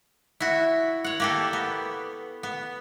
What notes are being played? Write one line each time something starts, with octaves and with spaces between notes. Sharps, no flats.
E4 F#4
C#5 F#5
A#3 G4 A4
B3
B3